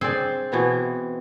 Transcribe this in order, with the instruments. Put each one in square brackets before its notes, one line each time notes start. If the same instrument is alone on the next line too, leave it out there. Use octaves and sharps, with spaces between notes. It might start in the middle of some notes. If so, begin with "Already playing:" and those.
[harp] C4 [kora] G#4 D5
[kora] B2 E3 B3